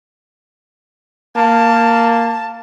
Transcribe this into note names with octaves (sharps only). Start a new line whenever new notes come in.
A#3 A5